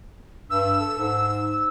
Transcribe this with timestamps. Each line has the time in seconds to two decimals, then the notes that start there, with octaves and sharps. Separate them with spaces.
0.50 G2 E6
0.81 A4
0.99 G#2